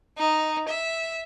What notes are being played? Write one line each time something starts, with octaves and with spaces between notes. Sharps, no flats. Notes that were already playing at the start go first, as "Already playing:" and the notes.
D#4
E5